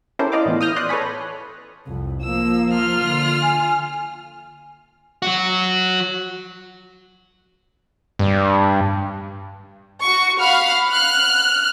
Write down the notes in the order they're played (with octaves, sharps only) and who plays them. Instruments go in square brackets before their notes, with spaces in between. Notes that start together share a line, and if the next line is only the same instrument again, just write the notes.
[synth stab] C#4 E4 G4 A4 A#4 C5
D5 D#5 F5 D6
A2 E3 B3 F4
D#6 F6 G6 A#6
D5 C6 D#6 F#6
A4 B4 C#5 G#5 B5
[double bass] C2 F2
[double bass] F3 A#3 [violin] E6
[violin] F4 F6
[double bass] D3
[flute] G#5
[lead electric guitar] F#3 F#4
[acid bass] G2
[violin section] F#4 C#6
F5 F#5 B5 F6
F6 F#6